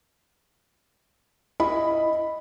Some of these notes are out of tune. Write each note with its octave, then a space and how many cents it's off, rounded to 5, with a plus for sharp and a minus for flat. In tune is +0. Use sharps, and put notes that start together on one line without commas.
E4 +10 D#5 +0 B5 +0